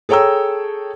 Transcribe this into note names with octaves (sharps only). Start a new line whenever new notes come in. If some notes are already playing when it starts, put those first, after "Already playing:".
G#4 A4 C#5 G5 A#5 E6